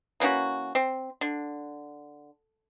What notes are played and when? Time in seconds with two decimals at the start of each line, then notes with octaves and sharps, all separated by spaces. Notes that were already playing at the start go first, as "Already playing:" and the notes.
0.20 E3 A#3 C#4 F#4
0.75 C4
1.21 D3